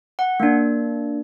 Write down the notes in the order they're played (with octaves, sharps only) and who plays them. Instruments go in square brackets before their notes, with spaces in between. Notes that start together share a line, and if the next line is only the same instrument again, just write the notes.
[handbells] F#5
A#3 D4